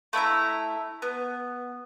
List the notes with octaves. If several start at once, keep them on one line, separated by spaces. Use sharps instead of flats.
A3 E4 E5 A#5
B3